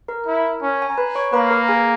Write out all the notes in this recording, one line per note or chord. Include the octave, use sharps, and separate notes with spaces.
A#4 A#5
E4
C#4
G#5
A#5
B4 B5
C#5 C#6
A#3 B4 B5
A#4 A#5
G#4 G#5